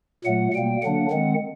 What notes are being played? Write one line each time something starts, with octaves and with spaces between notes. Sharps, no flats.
A#2 F#3 A3 F#5
B2 G3 A#3 G5
D3 F#3 A#3 D4 F#5
D#3 G#3 C4